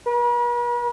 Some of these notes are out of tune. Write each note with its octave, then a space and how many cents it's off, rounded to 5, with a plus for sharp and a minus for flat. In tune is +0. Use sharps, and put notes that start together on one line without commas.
B4 -45